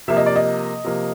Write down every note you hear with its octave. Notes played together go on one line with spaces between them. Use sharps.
C3 F3 A#3 E5
D#5
D5
D#5
C3 F3 A#3